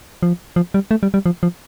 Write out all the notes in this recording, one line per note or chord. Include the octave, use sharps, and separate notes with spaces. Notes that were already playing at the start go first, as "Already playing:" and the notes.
F3
F3
G3
A3
G3
G3
F3
F3